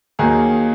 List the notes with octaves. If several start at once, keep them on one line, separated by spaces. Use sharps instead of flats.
D#2 D#3 F#3 A#3 G#4